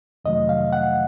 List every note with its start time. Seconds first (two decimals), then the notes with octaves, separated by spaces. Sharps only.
0.25 F2 C3 D#3 F#3 A3 D#5
0.49 F5
0.73 F#5